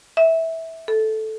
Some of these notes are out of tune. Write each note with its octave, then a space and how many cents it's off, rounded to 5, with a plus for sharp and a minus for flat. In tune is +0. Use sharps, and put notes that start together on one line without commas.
E5 -15
A4 -10